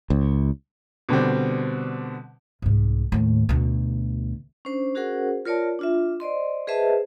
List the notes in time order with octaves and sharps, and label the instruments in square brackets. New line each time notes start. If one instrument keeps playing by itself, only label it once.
[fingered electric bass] C#2
[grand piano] B2 D3 G3 C4
[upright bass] C2 G#2
D#2 A2
D2 B2
[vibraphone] C#4 D4 C5
C#4 F#4 G#4 A#4 C5 F#5
F4 A#4 C#5 D5 A5
D4 F4 E5
C5 D5 D#5 C6
G#4 B4 C5 D#5 E5 A5